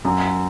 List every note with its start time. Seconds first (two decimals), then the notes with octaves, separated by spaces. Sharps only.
0.05 F#2